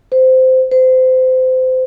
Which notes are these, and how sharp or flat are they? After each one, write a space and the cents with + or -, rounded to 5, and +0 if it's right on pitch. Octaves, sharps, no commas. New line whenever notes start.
C5 -15
C5 -25